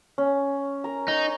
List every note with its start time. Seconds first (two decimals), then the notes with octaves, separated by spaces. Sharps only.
0.18 C#4
0.84 A#4 A#5
1.08 D#4 G#5 A#5 C#6